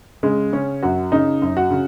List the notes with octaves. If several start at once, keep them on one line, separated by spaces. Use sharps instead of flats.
C#3 G#3
C#3 C#4
F#2 F#4
C#3 D#4
F#2
F#4
C#3